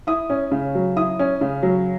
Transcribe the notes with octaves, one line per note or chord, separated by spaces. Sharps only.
E4 D#6
C#4
C#3
F#3
E4 D#6
C#4
C#3
F#3